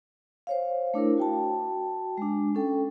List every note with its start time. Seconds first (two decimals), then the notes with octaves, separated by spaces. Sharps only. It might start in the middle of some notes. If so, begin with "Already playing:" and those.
0.47 C5 C#5 F5
0.94 A3 D4 E4 A#4
1.18 F#4 G5 A5
2.18 G#3 D4
2.55 C#4 A4 G5